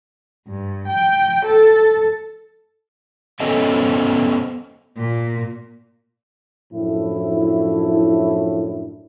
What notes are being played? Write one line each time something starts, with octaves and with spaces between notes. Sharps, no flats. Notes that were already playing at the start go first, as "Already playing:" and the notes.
G2
G5
A4
B3 C#4 A4 C5 D#5 G#5
A#2
F#2 A2 F3 D4 E4